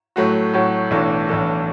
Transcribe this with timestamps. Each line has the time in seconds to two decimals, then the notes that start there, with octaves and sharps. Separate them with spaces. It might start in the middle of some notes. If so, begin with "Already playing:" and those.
0.16 A2 F#3 A3 F#4
0.54 A2 F#3 A3 F#4
0.91 B1 A2 E3 D4 A4
1.28 B1 A2 E3 D4 A4